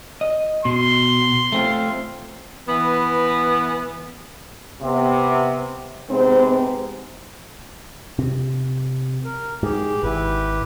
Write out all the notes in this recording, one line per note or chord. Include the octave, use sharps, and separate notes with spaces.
D#5
B2 C6
A3 C4 F4
E3 B3
C3 B3
C3 G#3 B3 C4 D#4 C5
C3
A#4
G#2 G4 G#4
G#1 E4 G4 B4